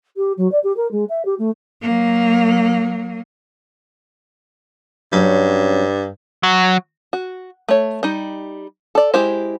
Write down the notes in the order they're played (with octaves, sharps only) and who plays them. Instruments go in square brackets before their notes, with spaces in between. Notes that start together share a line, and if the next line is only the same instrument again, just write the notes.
[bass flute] G4
F#3
D5
G4
A#4
G#3
E5
G4
A3
[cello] F#3 A#3
[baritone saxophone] G2 [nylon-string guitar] F#3 C#4 C#5
[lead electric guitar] F#3
[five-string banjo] F#4
A3 C#5
G3 D#4
A4 D5
G#3 E4 G4 C5